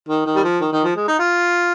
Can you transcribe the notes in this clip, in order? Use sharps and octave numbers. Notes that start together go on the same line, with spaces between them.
D#3
D#3
G3
F3
D#3
D#3
F3
G#3
D#4
F4